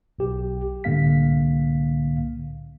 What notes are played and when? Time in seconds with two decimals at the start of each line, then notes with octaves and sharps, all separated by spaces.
0.19 B1 G4
0.84 C2 A2 D3 A#3 F5 B6